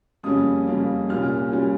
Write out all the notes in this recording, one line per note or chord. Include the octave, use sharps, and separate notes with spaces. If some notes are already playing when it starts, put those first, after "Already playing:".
F2 C#3 G3 A#3 C#4 D#6
F2 C#3 G3 A#3 C#4
C2 A#2 G3 C#4 F6
A#2 G3 C#4